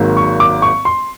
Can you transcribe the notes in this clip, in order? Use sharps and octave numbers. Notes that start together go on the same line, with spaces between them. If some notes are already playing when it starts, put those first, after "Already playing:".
Already playing: G#1 G#2 D#3 F#3 A#3
C#6
D6
C#6
C6